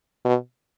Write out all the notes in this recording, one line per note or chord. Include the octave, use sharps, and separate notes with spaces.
B2